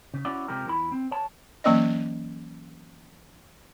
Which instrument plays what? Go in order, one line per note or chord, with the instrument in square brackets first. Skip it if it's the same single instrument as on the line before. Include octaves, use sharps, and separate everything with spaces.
[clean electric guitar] C#3
C#4 E4 F#4 D5
C3 F3 G#3 G4 A#4
E2 E4 B5
C4
C#5 A5
[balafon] E3 F#3 A#3 C#4 D5 D#5